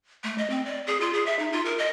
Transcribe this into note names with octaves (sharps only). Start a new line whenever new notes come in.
A3
D#5
C4
D5
G#4
F4
G#4
E5
D#4
F4
A#4
D#5